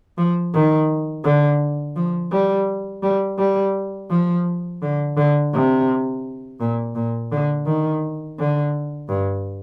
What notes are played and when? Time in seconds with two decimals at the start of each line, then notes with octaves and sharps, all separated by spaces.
0.18 F3
0.54 D#3
1.24 D3
1.96 F3
2.32 G3
3.03 G3
3.38 G3
4.11 F3
4.82 D3
5.17 D3
5.53 C3
6.60 A#2
6.95 A#2
7.32 D3
7.66 D#3
8.38 D3
9.09 G2